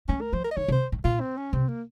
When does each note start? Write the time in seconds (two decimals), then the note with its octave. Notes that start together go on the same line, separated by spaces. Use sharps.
0.09 A3 C#4
0.21 A#4
0.33 F3 C5
0.44 A#4
0.51 D#5
0.56 D#3 C#5
0.68 C3
0.72 C5
0.92 A2
1.04 A#2 F4
1.21 C4
1.37 C#4
1.53 C3 C4
1.68 A#3